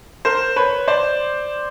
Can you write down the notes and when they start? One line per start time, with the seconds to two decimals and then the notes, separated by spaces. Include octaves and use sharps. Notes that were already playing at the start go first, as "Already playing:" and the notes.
0.25 A#4 C5
0.56 B4 C#5
0.88 C5 D5